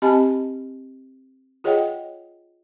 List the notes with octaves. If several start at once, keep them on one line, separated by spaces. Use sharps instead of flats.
C4 G4 D#5 G#5 A5 B5
F4 G#4 C#5 D#5 F#5 G5